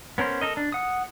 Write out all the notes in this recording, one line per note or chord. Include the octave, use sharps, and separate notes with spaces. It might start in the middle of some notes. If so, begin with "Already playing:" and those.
B3 C#4 A#4 C5
A4 A#4 D#5
D4
F#5 D#6